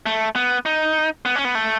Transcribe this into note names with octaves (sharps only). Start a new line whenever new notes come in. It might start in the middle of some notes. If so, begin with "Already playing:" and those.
A3
B3
D#4
B3
C#4
B3
A3